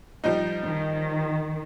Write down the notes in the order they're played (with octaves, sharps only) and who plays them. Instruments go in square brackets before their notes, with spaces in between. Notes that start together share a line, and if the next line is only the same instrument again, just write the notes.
[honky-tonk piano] F3 G3 D#4
[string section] D#3